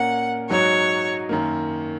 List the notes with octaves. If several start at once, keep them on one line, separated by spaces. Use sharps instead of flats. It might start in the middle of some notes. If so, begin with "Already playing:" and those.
Already playing: A#2 A#3 C#4 A#4 F#5
G#2 F#3 D#4 F#4 C#5
F#2 D#3 A#3